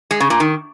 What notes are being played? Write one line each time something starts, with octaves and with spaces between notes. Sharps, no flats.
G#3
C#3
A#2
D#3